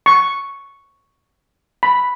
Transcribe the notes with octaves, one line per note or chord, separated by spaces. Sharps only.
C#6
B5